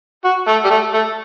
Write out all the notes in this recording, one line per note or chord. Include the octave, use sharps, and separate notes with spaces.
F#4
A3
G3
A3
A3